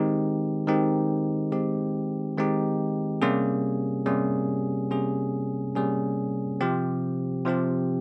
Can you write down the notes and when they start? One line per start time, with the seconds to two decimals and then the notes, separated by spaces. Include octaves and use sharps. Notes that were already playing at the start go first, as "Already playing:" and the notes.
Already playing: D#3 G#3 C4 D#4 G4
0.67 D#3 G#3 C4 D#4 G4
1.52 D#3 G#3 C4 D#4 G4
2.38 D#3 G#3 C4 D#4 G4
3.22 C3 G3 A#3 C#4 G#4
4.06 C3 G3 A#3 C#4 G#4
4.91 C3 G3 A#3 C#4 G#4
5.75 C3 G3 A#3 C#4 G#4
6.61 C3 F3 C4 G4
7.45 C3 F3 C4 G4